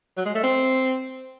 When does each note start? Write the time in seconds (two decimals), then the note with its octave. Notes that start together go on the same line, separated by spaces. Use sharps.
0.17 F#3
0.25 G#3
0.35 A3
0.43 C4